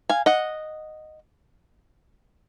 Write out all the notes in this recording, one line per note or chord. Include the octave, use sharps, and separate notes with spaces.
F5 G#5
D#5 F#5